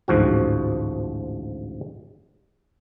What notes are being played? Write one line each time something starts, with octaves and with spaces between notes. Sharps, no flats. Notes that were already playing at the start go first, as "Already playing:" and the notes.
A1 D2 G#2 F3 F#4